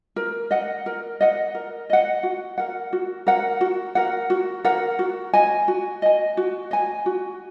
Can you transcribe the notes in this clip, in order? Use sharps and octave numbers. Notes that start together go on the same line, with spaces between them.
A#4
D#5 F#5
A#4
D#5 F#5
A#4
D#5 F#5
F#4
A#4 F#5
F#4
A#4 F#5
F#4
A#4 F#5
F#4
A#4 F#5
F#4
D#5 G#5
F#4
D#5 G#5
F#4
D#5 G#5
F#4